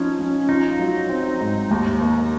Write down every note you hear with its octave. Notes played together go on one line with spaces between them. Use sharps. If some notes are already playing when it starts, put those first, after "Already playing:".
Already playing: F3 C#4 D#4
F3
D#4 F4
F#3
C4
G#2
D#2
A#3